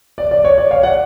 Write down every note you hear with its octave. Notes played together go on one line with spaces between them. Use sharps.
D5
D5
C#5
D5
C#5 F5
D5 F#5